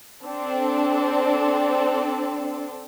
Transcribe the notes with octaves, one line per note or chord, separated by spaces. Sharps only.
C4 D4 A4